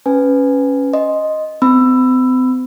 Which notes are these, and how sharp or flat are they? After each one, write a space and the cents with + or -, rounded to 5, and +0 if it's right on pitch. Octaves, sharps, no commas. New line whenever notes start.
C#4 +0 B4 +15 G#5 +0
D#5 +0 C6 +0
C4 -40 B5 +10 E6 +15